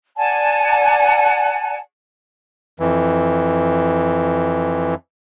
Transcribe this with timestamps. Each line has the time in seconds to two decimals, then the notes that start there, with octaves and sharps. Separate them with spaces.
0.17 D5 F#5 G#5 A5
2.80 F2 E3